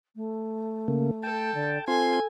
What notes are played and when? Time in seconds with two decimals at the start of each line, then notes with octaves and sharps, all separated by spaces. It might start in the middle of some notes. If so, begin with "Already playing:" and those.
0.16 A3
0.88 C#3 A#3
1.23 A4 G5 A5
1.54 D3
1.88 C4 F4 A4 G#5 C6